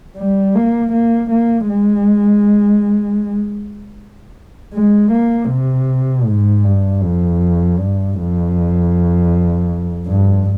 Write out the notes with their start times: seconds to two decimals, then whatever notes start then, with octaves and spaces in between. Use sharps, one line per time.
0.17 G3
0.55 A#3
0.93 A#3
1.31 A#3
1.69 G#3
4.74 G#3
5.12 A#3
5.50 C3
6.26 G#2
6.64 G2
7.03 F2
7.79 G2
8.17 F2
10.08 G2